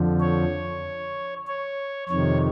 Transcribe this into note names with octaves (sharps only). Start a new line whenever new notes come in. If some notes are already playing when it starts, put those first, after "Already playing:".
Already playing: F2 D3 F3
C#5
C#5
F2 C3 D#3 C#5